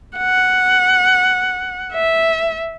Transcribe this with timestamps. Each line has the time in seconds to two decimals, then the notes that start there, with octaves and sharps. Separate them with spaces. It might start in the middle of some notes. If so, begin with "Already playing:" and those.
0.18 F#5
1.93 E5